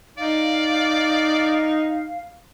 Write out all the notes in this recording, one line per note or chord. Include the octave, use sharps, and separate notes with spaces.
D#4 D5 F5